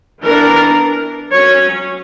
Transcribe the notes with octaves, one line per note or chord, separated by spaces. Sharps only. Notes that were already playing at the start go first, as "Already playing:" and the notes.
E3 B3 D4 A#4
F#3 C#4 C#5